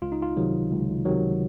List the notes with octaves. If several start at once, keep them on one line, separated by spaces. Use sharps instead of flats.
C#2 F4
D#4
F4
C3 D#3 F#3
C#2
C3 D#3 F#3